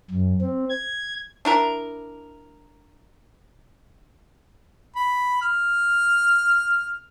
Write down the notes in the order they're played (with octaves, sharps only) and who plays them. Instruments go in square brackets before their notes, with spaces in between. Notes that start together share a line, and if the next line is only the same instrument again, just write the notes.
[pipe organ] F#2
C4
G#6
[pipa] D4 E4 A#4
[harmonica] B5
F6